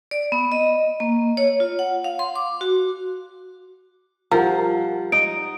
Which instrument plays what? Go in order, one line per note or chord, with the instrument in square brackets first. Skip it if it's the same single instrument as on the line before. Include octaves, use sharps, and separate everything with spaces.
[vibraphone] D5
B3
D#5
A#3
C#5
F4
F#5
F5
C6
D6
F#4
[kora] F3 [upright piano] G3 F4 F#5 [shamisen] A#4
[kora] D#4 [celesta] D7